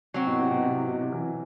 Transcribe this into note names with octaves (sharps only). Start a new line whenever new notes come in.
F#3 C4 F#4
B2
C3
B2
C3
C3
B2
C3
E3